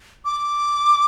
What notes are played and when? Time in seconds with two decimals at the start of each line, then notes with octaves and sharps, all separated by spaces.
0.25 D6